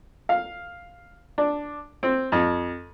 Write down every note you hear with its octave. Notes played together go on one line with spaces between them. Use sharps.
F5
D4
C4
F2